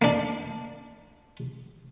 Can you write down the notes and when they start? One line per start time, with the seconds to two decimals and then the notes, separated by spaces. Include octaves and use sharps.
0.02 A#3 D4